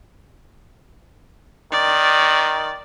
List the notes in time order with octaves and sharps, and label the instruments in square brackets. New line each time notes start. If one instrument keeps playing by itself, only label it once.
[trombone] D#3 [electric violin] D5